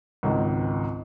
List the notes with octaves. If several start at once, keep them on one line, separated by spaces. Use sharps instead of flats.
G#1 C#2 G#2